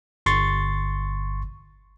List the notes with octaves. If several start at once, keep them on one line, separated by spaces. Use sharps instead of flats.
G1 C6 C#6 A6